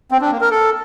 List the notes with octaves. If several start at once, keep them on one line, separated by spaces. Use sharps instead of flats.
C4
D4
A#3
A#4
A4